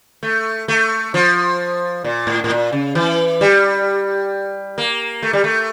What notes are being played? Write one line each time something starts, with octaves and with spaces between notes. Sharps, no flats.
A3
A3
F3
A#2
A2
A2
A#2
C#3
E3
G3
A#3
A3
G3
A3